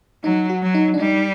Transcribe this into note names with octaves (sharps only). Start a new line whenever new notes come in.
F#3 D#4
F#4
F#3
D#4
D4
G3 D#4